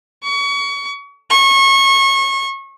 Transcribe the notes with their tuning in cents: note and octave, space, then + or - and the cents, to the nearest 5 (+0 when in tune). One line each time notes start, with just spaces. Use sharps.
C#6 +30
C#6 -30